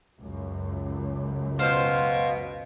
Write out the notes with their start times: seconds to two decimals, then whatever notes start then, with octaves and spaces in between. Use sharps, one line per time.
0.21 C#2 F#2
1.59 B2 C5 F5